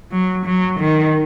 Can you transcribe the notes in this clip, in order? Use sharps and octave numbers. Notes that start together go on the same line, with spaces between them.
F#3
F#3
D#3